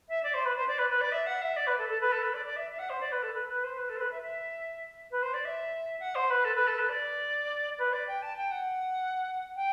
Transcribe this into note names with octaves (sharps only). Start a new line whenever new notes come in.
E5
D5
C5
B4
C5
D5
B4
B4
D5
E5
F#5
E5
D5
B4
A4
A4
B4
A4
B4
D5
D5
E5
E5
F#5
C5
D5
B4
A4
B4
B4
C5
B4
A4
C5
B4
E5
E5
B4
C5
D5
E5
F#5
C5
B4
A4
B4
A4
B4
D5
B4
D5
G5
A5
G5
F#5
G5